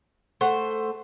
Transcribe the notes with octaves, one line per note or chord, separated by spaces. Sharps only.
A3 C5 F#5